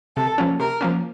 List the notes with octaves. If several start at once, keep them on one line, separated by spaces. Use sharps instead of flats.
C3 A4
F3 A#3 C#4
C3 A#4
F3 A#3 C#4